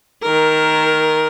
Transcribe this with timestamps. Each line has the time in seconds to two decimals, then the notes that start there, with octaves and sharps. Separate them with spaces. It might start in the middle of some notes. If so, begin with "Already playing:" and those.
0.22 D#3 A#4